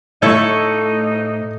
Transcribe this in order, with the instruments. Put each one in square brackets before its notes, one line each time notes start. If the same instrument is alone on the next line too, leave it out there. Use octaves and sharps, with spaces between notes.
[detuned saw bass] A2 [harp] A3 C#6 [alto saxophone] D#4 [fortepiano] E4 A4 C#5